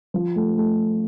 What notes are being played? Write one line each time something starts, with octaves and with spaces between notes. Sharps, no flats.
F3
A3
A3